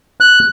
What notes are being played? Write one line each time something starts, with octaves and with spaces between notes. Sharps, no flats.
F#6